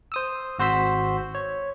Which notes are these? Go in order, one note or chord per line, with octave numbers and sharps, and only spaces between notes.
C5 D#6 E6
G#1 F#4 C5 C6 E6 B6
C#5